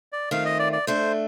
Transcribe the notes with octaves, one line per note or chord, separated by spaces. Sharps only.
D5
D#3 A3 C4 F4 F5
D#5
D5
D5
A3 D4 A4 C5